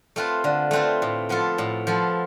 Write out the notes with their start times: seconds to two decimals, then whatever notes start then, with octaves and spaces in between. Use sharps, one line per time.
0.16 A3 C4 F4 B4
0.44 D3
0.71 A3 C4 F4 B4
1.02 A2
1.29 F3 B3 F4 A4
1.58 A2
1.87 F3 B3 F4 A4